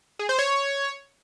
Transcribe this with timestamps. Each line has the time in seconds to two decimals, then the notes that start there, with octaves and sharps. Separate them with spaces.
0.19 G#4
0.29 C5
0.39 C#5